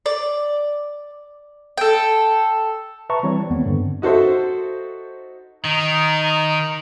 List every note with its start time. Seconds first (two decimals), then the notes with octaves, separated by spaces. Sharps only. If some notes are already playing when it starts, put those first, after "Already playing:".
0.06 D5
1.78 A4 G5
3.10 B4 E5 A5 A#5 C#6
3.23 E3 G3 C4 C#5
3.50 D#2 B3 C4
3.65 G2 D3
4.02 D#4 F#4 A4 C5 E5
5.65 D#3 D#4